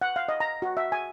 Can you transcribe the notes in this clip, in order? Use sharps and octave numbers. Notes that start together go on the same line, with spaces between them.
F#5
F5
D#5
A#5
F#4
E5
G#5